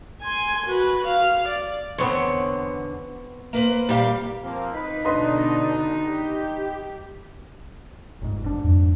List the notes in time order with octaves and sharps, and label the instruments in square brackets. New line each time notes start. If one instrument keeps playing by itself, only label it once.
[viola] G#5 C6
F#4 B4
F5
D5
[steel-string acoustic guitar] E2 D3 [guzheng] B3 C4 C#5
[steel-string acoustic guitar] A#3 B4 C5
[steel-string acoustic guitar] A#2 G4 F5 [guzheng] G3
[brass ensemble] F3 A#3 C4
[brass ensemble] D#4 [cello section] B4
[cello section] B2 D3 D4 [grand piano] B4 D#5 C6
[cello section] G4
[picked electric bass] G1 G#2
F#1 G#2 D4
[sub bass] F2